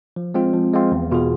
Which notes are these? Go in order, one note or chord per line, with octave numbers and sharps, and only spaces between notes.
F3
G#3 C4 F4
F3
G#3 C4 F4
E2
B2 B3 F4 G#4